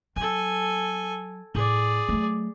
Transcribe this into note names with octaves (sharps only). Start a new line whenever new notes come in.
F#3 A4 G#5
A2 G#4 D5
F#3 A3